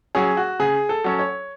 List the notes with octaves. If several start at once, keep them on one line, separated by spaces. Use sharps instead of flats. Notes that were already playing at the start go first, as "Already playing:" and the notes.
F#3 C#4 G#4
F#4
C#3 G#4
A4
F#3 C#4
C#5